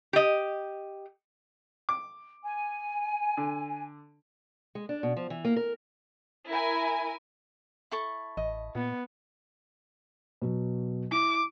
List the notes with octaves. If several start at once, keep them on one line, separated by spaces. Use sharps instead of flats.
G4 D#5
D6
G#5
D3
G#3
D4
B2
F3
E3
A#3
A#4
E4 A#4 G#5
E4 A4 C#6
A1 D#5
A#2 B3
B2 F#3
E4 D6